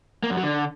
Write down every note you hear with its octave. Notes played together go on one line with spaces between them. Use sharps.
A#3
F#2
F#3
D3